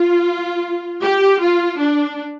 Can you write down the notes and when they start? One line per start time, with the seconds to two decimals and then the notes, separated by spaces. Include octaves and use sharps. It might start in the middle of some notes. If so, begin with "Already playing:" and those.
Already playing: F4
1.02 G4
1.41 F4
1.80 D4